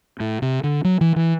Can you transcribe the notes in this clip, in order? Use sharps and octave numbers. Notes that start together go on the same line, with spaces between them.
A2
C3
D3
F#3
E3
E3